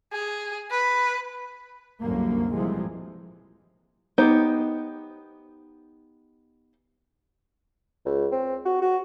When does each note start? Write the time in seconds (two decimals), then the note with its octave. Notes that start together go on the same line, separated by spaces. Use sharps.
0.12 G#4
0.70 B4
2.00 C2 F#2 D3 A#3
2.52 A2 C3 E3 F3 G3 G#3
4.18 B3 D#4 G4 C5
8.05 C#2
8.32 C4
8.65 F#4
8.82 F#4